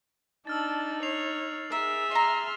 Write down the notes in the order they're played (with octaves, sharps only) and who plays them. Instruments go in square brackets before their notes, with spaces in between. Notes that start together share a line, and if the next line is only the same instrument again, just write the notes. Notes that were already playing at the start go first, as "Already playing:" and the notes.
[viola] D4 A5 [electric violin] D#4 [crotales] E6 F6 A6
[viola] C#5 [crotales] C7 F7
[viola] G#4 E5 [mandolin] A#4
[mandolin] D#5 A#5 [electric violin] C6 F6